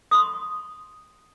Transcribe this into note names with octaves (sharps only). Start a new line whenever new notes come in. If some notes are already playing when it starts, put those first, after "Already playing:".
C6 C#6 D#6